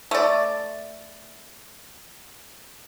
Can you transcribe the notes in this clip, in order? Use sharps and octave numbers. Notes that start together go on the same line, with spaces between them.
A3 D5